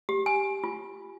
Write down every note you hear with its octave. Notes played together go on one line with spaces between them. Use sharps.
G4
G#5
F4